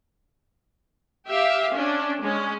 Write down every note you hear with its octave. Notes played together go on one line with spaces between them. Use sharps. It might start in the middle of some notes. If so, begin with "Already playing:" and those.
G4 E5 F5
C#4 D4
G#3 C#4